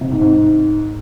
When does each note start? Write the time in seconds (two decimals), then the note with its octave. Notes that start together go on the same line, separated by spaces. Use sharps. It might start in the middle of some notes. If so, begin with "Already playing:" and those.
0.01 C3
0.11 G#2
0.22 G#2